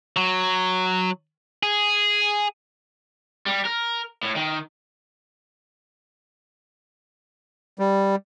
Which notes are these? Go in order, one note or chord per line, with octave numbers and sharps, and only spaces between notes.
F#3
G#4
G3
A#4
A2
D#3
G3